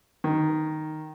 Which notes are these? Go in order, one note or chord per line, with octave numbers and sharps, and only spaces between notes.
D#3